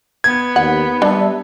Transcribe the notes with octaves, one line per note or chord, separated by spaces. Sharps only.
B3 G#6
D#2 F#5
G3 D4 E5 A5